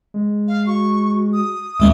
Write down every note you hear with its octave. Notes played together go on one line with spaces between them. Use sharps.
G#3
F5
F#4 C#6
D#6
D#2 G#3 A3 E5